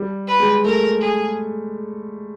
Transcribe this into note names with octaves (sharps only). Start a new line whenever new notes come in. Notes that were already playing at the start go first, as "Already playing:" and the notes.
Already playing: G3
B4
G#3
A3 A#4
G#4